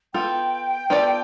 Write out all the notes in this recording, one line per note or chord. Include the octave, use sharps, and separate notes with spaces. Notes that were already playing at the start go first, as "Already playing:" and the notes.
B3 F4 A4 G5
B3 F4 A4 D5